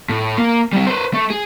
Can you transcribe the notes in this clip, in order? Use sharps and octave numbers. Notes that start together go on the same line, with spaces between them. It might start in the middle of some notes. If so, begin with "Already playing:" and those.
A2
A#3
G3 C4
B4 C5
A3
G#4